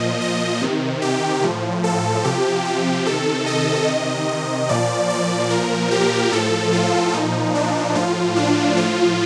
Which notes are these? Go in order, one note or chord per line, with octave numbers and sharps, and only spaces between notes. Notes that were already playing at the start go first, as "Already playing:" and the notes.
Already playing: A#2 F3 D#5
D#5
C3 D#3
G4
A2 F3
A4
C3 F3 G4
G4
C3 D#3 A4
D#5
C3 D#3
A#2 F3 D5
D5
A#2 F3 A#4
G4
A2 F3 A4
F4
A#2 F3 D#4
D4
A2 F3 F4
D4
A2 F3 F4